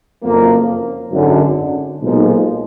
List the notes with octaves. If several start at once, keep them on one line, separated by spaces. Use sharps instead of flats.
F#1 F2 F3 A#3
G#1 F#2 D3
B1 A#2 F3 G#3 D#4